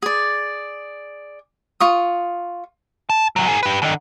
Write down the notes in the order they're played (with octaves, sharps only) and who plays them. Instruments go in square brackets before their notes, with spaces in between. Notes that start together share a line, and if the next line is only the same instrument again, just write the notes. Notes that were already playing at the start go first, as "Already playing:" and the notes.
[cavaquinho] G#4 D5
F4 C#6 D#6
[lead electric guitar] A5
C#2 F#3
G#4 A#4
G4 B4
D3 D#3